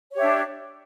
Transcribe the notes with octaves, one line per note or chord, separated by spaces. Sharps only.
D4 G4 C#5 E5